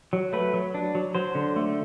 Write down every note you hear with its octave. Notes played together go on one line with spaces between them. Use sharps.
F#3
A3 B4
F#3
D4
F#3
F#3 C5
D3
A3